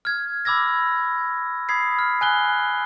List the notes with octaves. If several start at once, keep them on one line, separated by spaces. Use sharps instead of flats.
F6 G#6
B5 D6 E6 G#6 A#6
B5 D#6 G#6 B6 C7
F6
G#5 F#6 G7